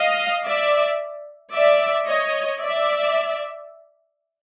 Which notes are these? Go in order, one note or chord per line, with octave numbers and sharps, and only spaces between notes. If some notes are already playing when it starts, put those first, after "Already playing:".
Already playing: D#5 F5
D5 E5
D5 E5
C#5 D#5
D5 E5